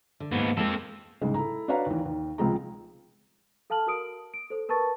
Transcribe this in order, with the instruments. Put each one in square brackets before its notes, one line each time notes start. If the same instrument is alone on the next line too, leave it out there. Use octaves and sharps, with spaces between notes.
[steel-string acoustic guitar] D3
[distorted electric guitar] D#2 B3 [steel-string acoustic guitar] G#2
[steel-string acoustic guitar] G#3 A#3 [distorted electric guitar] C4 A4
[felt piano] C2 G#2 C#3 G#3
E4 A4 A#5
D4 F#4 B4 C#5 F5 A#5
D#2 E3
D#2
C#2 C3 F3 G#3 A#5
[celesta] A4 F5 A5 F6 F#7
F#4 A#4 D#6 D7
D7
A4 C5
A#4 B4 A5 C#6 A6